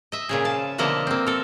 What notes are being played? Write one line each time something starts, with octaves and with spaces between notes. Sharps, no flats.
D#5 E5
A#2 C#3 G#4
F3 A5
B2 D3 F3 A#3 E4 D#5
A#3 C4
A4 A#4